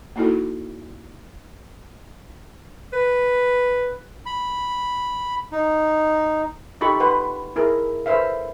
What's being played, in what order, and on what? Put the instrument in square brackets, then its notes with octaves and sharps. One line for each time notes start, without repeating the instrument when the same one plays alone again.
[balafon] A#3 D#4 E4 F#4 A4
[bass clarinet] B4
[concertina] B5
D#4
[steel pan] D#4 F4 G4 A4 B5 C#6
B4 F#5 C6
E4 G#4 A#4
A4 B4 C5 E5 F5